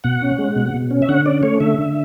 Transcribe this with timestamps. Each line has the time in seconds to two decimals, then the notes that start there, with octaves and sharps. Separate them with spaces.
0.04 B2 F#5
0.22 C#4
0.39 G#3
0.56 B2
0.74 B2
0.91 C#4
1.02 E5
1.09 D3 F#5
1.26 C#4 D5
1.43 A3 C#5
1.60 D3 E5
1.78 D3